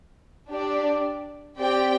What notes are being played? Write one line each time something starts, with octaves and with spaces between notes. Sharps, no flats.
D4 G4 D5
C4 G4 D5 G5